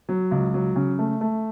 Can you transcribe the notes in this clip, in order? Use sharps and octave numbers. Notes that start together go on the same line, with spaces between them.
F#3
C#2
F#3
C#3
A3
A3